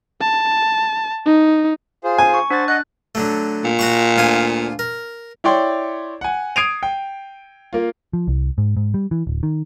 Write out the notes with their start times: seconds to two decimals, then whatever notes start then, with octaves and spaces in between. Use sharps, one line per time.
0.21 A5
1.26 D#4
2.04 F4 G#4 C5
2.18 G#5
2.34 C#6
2.50 D4 C5 F#5 A6
2.68 D#5 F#5 F#6
3.15 D3 F#3 A3
3.64 A#2
3.79 F#4 F#5 C#6
4.17 D2 F4 G#5
4.79 A#4
5.44 E4 C#5 D5 G5 C6
6.21 F#5 G#5
6.56 D#6 G#6 C7 D7 D#7 F7
6.83 G5
7.73 A#3 F4
8.13 F3
8.28 C2
8.58 G#2
8.77 G#2
8.94 G3
9.11 E3
9.27 D1
9.43 D#3